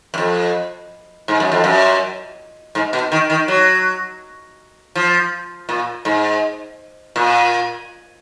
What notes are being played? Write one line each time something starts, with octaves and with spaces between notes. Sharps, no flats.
F#2
F2
G#2
F#2
F2
F#2
G#2
B2
D#3
D#3
F#3
F3
A#2
G#2
A#2